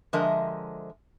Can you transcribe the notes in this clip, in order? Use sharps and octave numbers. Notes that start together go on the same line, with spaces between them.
D3 F3 G#3 A#4 D#5 E5